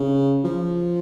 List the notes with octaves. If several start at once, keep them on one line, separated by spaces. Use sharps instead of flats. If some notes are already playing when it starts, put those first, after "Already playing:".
Already playing: C#3
F3